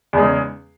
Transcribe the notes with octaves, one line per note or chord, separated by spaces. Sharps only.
E2 C#3 G#3